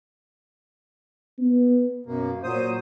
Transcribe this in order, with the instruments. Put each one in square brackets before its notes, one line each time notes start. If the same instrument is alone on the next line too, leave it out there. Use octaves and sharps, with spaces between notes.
[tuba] B3
[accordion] F#2 A#3 [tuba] B2
[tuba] A#2 [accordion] F#3 C5 D#6